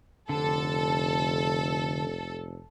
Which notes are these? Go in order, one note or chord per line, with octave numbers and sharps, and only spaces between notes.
F1 D3 A4